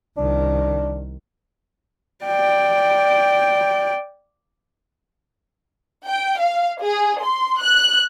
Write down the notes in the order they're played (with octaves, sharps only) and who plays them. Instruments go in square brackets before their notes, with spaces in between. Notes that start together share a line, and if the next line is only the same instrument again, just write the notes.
[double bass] C2 D#3 [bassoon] D4
[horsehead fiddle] D5 G5
[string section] G5
F5
G#4
C6
F#6